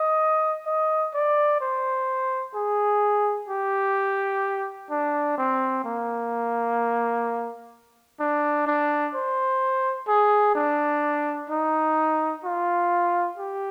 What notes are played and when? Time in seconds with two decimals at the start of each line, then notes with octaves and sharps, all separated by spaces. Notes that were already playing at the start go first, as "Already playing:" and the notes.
Already playing: D#5
0.66 D#5
1.14 D5
1.61 C5
2.55 G#4
3.49 G4
4.90 D4
5.38 C4
5.85 A#3
8.20 D4
8.67 D4
9.15 C5
10.08 G#4
10.55 D4
11.50 D#4
12.44 F4
13.38 G4